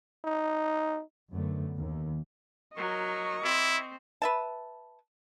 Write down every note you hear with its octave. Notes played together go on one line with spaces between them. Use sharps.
D#4
F#2 D3 A3 B3
D#2
F#3 A#4 D#5 C#6
C4 E4
B4 E5 A5